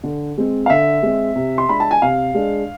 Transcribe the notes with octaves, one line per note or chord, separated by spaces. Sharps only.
D3
G#3 C4
F5
D3 E5
G#3 C4
C3
C6
G#3 D4 B5
A5
G#5
C3 F5
G#3 D4